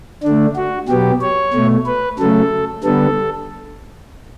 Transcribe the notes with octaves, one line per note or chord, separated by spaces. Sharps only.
D3 A3 D4
F#4
B2 F#3 B3 G4
C#5
B2 A3
B4
C#3 F#3 A3 A4
D3 G3 B3 A4